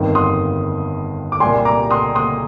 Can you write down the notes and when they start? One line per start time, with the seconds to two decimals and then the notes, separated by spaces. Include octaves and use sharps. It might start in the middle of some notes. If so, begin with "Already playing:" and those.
Already playing: G1 F2 D#3
0.15 C6 D#6
1.32 D6
1.40 C2 A#2 G3 G#5 C6
1.65 A#5 D6
1.91 C6 D#6
2.15 C6 D#6